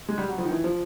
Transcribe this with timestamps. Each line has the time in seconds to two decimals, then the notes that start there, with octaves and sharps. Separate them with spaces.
0.09 G#3
0.18 G3
0.28 F#3
0.38 F2 F3
0.45 D#3
0.51 E3
0.64 F3